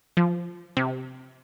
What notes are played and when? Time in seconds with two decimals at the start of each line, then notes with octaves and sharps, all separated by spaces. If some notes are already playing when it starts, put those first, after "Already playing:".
0.17 F3
0.77 C3